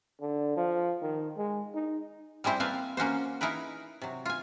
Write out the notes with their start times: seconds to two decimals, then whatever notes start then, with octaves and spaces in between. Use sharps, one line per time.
0.20 D3
0.56 F3
1.01 D#3
1.37 G#3
1.74 D#4
2.44 G3 G#3 C4 E4 C5
2.60 A#3 C4 B4 F5 G#5 A5
2.97 A#3 C#4 F#4 C5
3.41 D#4 E4 G#4 A#4 B4
4.02 C3 F#3
4.26 F4 G#5